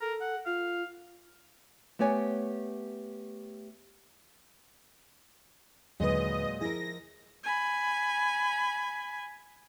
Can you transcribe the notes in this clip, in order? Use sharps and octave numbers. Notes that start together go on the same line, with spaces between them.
A4 A#4
F#5
F4 F5
A3 B3 G4 C#5 G#5
D#2 A#2 D3 F#3 G#3 B4 D#5
F3 E4 G#4 A#4 A#6
G#5 B5